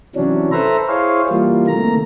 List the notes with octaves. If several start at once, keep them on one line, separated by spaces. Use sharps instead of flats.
C3 E3 F#3 C#4 D4
A4 B4 C5 E5 A#5
E4 G#4 C5 C#5 F5
E3 G3 A#3 F4
C3 D#3 A3 A#3 A#5